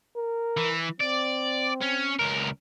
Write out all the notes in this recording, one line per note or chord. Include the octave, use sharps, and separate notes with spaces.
A#4
E3
C4 D5
C#4
C#2 A#4